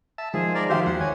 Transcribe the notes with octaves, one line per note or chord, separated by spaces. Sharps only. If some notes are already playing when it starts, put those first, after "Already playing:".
E5 A5
D#3 F3 G#3 G#4
A#4 D5
F#4 G4 C5 E5 F5
D#2 F#5
C#5 G#5